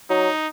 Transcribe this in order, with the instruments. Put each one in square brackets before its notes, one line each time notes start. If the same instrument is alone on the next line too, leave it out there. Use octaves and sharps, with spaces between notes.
[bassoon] F#3 [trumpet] D#4